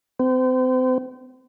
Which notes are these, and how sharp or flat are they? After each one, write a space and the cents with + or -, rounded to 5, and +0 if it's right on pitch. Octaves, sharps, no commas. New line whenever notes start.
C4 -35